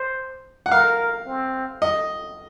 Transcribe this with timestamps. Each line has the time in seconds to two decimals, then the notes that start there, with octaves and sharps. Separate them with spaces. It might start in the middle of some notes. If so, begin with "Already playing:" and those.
Already playing: C5
0.66 F#5
0.72 A#4 F5
1.27 C4
1.82 D#5